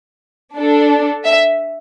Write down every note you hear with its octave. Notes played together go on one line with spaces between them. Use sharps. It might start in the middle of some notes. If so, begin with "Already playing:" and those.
D4 A4
E5